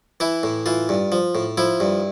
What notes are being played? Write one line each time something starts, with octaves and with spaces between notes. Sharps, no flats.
E3 E4
A2
E3 F4
G2
F3
A2
F3 E4
G2